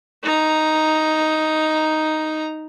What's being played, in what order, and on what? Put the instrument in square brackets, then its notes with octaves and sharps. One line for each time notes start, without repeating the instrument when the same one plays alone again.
[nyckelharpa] D#4 A#5